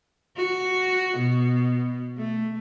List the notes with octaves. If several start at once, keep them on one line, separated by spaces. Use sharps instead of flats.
F#4
B2
A3